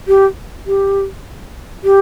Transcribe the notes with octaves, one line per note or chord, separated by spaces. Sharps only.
G4
G4
G4